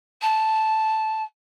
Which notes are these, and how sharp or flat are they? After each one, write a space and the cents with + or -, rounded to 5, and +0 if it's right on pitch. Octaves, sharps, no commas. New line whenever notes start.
A5 -5